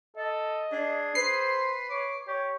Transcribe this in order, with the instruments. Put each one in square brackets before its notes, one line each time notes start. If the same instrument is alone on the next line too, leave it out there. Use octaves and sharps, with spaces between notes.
[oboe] A4 [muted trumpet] D#5
[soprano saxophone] D4 [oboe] G#4
[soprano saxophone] B4 [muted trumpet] C5 [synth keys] C7
[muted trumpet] C#5 [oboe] D6
[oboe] G4 [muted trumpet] C#5